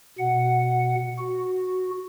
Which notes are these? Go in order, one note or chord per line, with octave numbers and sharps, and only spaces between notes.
B2 F#5
F#4